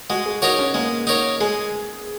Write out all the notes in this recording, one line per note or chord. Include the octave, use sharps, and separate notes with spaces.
G#3 F#4
G#4
D#4 F#4 A#4 C#5
C#4
G#3 A#3
D#4 A#4 C#5
G#3 G#4